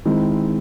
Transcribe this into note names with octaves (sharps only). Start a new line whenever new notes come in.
D#3 G#3 C4 E4